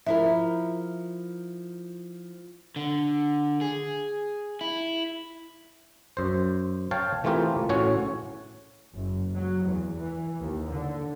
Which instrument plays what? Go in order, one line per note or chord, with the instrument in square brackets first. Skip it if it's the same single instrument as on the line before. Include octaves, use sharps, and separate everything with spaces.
[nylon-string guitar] F3 E4 A#4 [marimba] E5
[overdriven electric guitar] D3
G#4
E4
[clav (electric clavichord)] F#2 C5
C#5 F5 G5 A5
E3 A3 C4 F4 G4 A#4
A2 C#4 F#4 C#5
[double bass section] F#1
F#3
E2
E3
D#2
D3